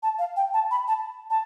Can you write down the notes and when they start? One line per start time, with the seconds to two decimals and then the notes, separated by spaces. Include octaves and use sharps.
0.03 A5
0.19 F5
0.36 G5
0.54 A5
0.71 B5
0.88 A5
1.30 A5